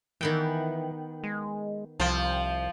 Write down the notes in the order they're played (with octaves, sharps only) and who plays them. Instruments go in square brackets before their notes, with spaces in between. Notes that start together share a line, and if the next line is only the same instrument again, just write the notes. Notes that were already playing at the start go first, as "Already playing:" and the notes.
[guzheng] D#3 B3 G5 [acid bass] E3
[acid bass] G#3
[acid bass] C2 [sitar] F3 [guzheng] C5 G5